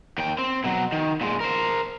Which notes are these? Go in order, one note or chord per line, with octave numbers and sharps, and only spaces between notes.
D#2 G5
C4
B2 F#3
D#3
A#2 G#3
A#4 C5